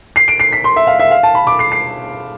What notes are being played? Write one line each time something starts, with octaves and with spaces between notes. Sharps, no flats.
C7
D7
C7
B6
C6
E5
F5
E5
F5
A5
B5
D6
C7
C7